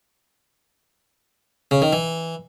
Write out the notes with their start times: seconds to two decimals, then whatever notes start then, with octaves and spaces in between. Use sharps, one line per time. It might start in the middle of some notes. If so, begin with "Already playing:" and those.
1.71 C#3
1.82 D#3
1.93 E3